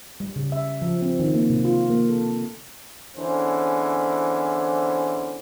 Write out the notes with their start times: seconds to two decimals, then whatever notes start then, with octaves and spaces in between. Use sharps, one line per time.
0.20 G3
0.36 C#3
0.52 E5
0.82 F3
1.02 C4
1.19 D#3
1.34 A#3
1.50 C3
1.65 F4
1.90 A#3
2.09 A4
3.15 E2 D3 E3 C#4 C5